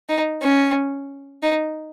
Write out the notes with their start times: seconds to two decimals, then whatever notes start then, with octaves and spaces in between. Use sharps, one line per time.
0.09 D#4
0.42 C#4
1.43 D#4